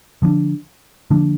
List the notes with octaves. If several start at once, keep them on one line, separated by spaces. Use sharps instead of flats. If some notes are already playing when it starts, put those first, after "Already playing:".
D3 F3 A#3 D4
D3 F3 A#3 D4